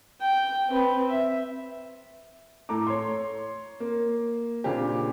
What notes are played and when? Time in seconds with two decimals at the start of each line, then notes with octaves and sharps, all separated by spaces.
0.21 G5
0.69 C4 B4
1.09 E5
2.69 A2 A3 A4 A#5 D6
2.87 C#5 C6
3.80 A#3
4.64 A#2 C#3 C4 D4 G4